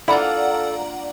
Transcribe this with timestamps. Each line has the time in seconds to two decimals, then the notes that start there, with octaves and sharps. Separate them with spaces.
0.08 A#3 D4 E4 F4 A4 D5 F#5 A#5